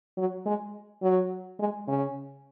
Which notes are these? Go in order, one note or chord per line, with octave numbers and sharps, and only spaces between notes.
F#3
G#3
F#3
G#3
C#3